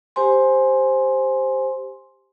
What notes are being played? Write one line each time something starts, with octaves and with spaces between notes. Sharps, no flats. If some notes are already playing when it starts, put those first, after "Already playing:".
G4 C5 G#5 C6